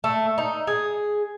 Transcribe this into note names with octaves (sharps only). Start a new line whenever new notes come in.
A3
D#4
G#4